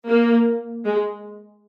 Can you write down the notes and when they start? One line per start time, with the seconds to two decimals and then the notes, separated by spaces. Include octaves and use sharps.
0.09 A#3
0.85 G#3